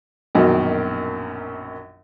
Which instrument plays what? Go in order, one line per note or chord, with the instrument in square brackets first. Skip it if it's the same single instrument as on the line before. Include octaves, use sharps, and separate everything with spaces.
[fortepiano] A#1 F#2 B2 D#3